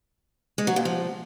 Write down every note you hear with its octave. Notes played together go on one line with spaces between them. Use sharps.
G#3
F#3
A#2
F3